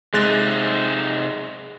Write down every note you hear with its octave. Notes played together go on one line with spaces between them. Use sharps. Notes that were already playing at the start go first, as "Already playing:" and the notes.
C3 G#3 D#4 F#6 A6